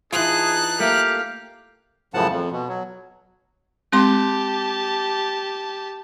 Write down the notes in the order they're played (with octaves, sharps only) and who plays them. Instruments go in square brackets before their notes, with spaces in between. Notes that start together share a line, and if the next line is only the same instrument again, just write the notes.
[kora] E3 F4 [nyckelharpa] D#4 A5 [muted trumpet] G#4 [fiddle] F#6
[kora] A3 A#3 [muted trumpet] G4 [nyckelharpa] F5
[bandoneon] F#2 A2 C#3 F3 F#5 A5
F2
B2
F#3
[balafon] G#3 C4 C6 [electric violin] G4 A5